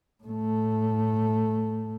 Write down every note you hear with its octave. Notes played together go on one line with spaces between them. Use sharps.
A2 A3